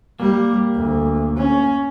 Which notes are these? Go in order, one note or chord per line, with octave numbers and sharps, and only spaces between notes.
G3 A#3
D2
C#4